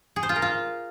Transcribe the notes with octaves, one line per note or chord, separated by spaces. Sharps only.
G#4
C5
F4
A#4
F4